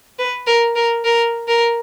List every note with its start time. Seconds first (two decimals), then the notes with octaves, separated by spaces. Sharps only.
0.19 B4
0.47 A#4
0.76 A#4
1.05 A#4
1.48 A#4